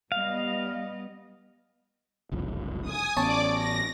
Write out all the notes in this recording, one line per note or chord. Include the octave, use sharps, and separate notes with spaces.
G3 B3 D#5 F5
F#1 C2 F2
G#5 D#6
A1 B3 C#4 C#5 D5 A5 D6
A#6